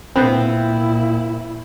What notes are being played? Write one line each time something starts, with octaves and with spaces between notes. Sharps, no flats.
A#2 B3 C4 E4